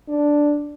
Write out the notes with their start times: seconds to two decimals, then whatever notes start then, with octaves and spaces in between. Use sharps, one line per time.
0.08 D4